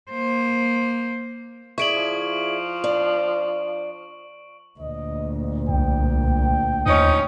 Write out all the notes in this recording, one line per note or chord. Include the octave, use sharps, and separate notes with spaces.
A#3 C5
E4 G#4 D5 C#6 D7 F#7
F3
D4
D2 A#2 D#5
C2 G5
D#2 F3 C#4 D#4